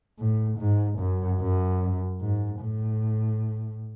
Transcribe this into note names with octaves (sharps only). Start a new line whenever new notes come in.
A2
G#2
F#2
F#2
G#2
A2